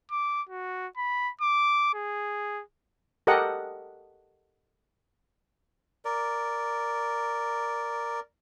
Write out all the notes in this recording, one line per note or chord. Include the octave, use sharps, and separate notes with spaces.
D6
F#4
B5
D6
G#4
G4 A4 A#4 D#5 F#5
A#4 D5